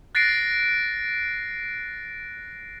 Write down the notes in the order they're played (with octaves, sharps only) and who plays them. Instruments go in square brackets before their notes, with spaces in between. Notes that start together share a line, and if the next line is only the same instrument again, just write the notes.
[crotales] F#6 A6 A#6 C7 D7